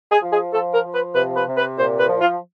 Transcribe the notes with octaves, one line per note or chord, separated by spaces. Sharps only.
G#4
F3
G#4
F3 A4
A#4
F3
B4
C3 B4
B4
C3
B4
A#2 C5
B4
F3
F4